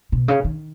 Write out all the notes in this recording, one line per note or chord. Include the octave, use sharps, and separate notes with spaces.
B2
C#3
D#3